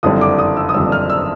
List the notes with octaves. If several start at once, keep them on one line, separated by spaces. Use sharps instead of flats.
F#1 F2 D3 G3 D#6
D6
D#6
E6
D#6
F#1 F2 D3 G3 E6
F6
E6